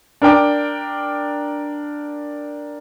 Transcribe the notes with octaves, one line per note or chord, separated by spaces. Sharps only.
D4 A#4 G5 D6